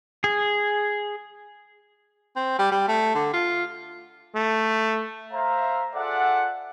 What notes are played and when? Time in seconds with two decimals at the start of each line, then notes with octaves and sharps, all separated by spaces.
0.24 G#4
2.36 C4
2.59 G3
2.72 G3
2.88 A3
3.15 D3
3.33 F4
4.35 A3
5.32 C5 E5 F5 A#5
5.95 F4 G#4 A4 D5 E5 F#5